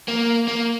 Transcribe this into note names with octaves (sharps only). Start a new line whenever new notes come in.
A#3
A#3